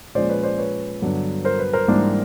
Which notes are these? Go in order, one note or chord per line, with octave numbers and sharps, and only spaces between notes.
A#2 F3 G#3 C#4 C5 D5
B4 C#5
C5 D5
B4 C#5
G2 D3 F#3 B3 D4
A#4 C5
B4
A#4 C5
G#2 E3 G3 A#3 D4